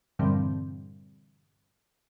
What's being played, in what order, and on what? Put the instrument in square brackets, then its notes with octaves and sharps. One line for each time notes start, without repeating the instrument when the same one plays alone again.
[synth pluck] G2 A#2 D3 E3 G3 C4